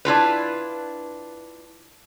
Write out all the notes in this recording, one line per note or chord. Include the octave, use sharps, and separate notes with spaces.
D4 E4 F4 B4